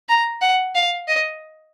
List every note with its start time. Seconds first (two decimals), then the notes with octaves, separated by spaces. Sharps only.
0.09 A#5
0.41 F#5
0.75 F5
1.08 D#5